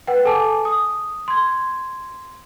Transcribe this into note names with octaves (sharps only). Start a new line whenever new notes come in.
B4 F#5 G5
G#4 A4 G#5 A5 D6
D#6
C6 G#6